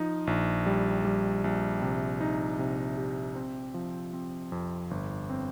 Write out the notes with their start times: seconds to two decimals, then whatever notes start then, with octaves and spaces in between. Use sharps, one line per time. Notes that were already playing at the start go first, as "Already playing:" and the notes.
Already playing: F3 D#4
0.27 A#1
0.66 G3
1.05 G3
1.44 A#1
1.82 C3
2.21 D#4
2.59 C3
2.98 G4
3.36 C4
3.74 F3
4.13 C4
4.52 F2
4.91 G1
5.30 C4